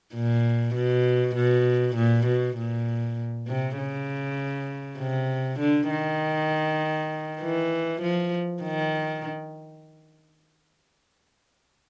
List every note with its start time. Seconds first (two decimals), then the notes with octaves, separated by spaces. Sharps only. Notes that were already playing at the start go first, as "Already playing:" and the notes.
0.14 A#2
0.75 B2
1.35 B2
1.96 A#2
2.26 B2
2.57 A#2
3.48 C3
3.78 C#3
4.99 C3
5.60 D3
5.90 D#3
7.41 E3
8.02 F3
8.63 D#3